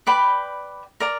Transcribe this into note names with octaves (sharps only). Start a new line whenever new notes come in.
B4 D5 G5 B5
A#4 D5 A#5